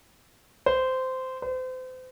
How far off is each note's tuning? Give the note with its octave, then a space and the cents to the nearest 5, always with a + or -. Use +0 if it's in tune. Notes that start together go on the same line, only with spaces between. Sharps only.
C5 -15
C5 -35